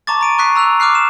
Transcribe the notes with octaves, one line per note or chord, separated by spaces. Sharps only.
A5 A#5 C#6 D6 A6
A#5 D7 D#7
C#6 D#6 F#6 B6 C7
A#5 E6 F#6 F7
D6 F6 F#6 C7
E7